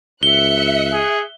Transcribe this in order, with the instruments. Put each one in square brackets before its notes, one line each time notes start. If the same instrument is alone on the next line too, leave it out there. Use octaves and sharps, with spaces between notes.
[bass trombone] C#2 [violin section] E5 F#6 C#7 [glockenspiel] G7
[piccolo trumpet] G#4